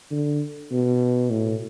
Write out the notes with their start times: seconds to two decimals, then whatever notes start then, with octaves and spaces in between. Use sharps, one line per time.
0.11 D3
0.71 B2
1.30 A2